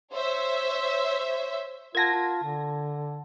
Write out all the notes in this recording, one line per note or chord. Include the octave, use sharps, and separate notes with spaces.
C5 C#5 E5
F4 A#4 F#5 A5 G#6 A#6
F4 A5
D3